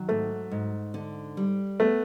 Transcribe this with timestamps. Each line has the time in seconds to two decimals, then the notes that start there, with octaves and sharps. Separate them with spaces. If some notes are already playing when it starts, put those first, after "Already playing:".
Already playing: D#3 F#3
0.09 G#2 A3
0.51 G#2
0.94 D3
1.37 G3
1.80 A3 B3